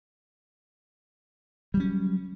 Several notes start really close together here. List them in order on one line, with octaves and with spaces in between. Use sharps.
G3 F#3 C#4